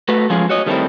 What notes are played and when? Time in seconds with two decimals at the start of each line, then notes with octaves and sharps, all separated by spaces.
0.08 A3 F#4 B4
0.30 F3 G#3 C#4 F4 G#4
0.49 F#4 C#5 D#5
0.66 D#3 G3 A3 A#3 C4 E4